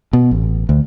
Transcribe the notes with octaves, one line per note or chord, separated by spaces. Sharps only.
B2
A1
D2